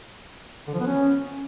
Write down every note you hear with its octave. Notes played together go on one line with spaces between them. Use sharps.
D3
F3
B3
C#4